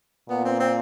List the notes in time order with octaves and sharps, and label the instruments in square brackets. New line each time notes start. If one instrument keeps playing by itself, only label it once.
[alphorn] A#2 [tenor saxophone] B3
[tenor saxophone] C4
C4